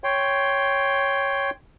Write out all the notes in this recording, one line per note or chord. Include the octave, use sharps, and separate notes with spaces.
C#5 G5 C6